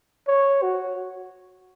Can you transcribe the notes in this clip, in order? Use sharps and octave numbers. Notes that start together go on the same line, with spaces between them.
C#5
F#4